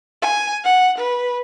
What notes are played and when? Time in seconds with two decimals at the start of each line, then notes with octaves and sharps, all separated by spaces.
0.22 G#5
0.64 F#5
0.98 B4